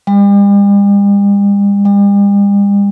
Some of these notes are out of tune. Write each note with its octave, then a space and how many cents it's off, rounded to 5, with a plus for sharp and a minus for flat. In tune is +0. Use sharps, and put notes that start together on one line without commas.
G3 +45
G3 +45